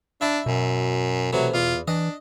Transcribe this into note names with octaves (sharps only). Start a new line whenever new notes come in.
D4 E4 E5
F#2 B2
C3 E3 F#3 A3
E2 F4
E3 D4 D#5